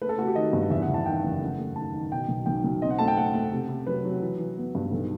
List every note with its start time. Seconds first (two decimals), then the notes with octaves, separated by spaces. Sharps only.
0.02 A3 B4
0.09 A4
0.18 A3 F#4
0.27 G4
0.35 D#3 D#5
0.53 G2
0.70 E2 E5
0.82 F#5
0.89 E2
0.94 A5
1.06 D#3 G5
1.24 F#1
1.41 A3 F#5
1.59 A3
1.76 D#3 A5
1.93 D#3
2.12 B2 G5
2.29 B1
2.46 B1 G5
2.64 B1
2.82 C4 D#5
2.90 F#5
2.99 A3 A5
3.08 G5
3.17 A3 F#5
3.34 A3
3.52 C3
3.69 C3
3.87 F#3 B4
4.04 F#3
4.22 E3
4.39 E3
4.57 B3
4.75 G2
4.92 B1 A4